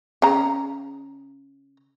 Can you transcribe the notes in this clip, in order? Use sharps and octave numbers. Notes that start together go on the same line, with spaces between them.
C#3 A#5